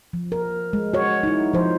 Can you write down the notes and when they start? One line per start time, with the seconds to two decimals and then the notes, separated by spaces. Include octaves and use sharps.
0.13 F3
0.32 A#4
0.73 G#3
0.94 F#4 C#5
1.23 D#4 E4
1.53 F3 C5